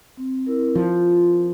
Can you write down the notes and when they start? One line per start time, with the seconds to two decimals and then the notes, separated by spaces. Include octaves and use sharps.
0.17 C4
0.47 E4 A#4
0.75 F3 F4